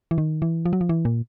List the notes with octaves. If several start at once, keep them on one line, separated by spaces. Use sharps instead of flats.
E3
D#3
E3
F3
F#3
F3
E3
A#2